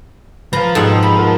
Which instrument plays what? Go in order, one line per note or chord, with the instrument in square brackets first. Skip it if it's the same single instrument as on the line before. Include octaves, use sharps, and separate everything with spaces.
[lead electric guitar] F3 [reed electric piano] B4 F5 [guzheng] A#5
[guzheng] G#2 B2 F#5 [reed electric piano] A4 G5 E6
[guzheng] B5
[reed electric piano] F4 A#4 F#5